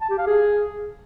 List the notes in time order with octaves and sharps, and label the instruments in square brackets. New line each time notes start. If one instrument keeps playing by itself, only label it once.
[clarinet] A5
G4
F5
G#4